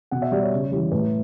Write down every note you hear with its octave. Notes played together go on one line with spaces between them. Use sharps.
B2 F#5
E5
G3 D5
C#5
C#3
E3 G3
A2 B4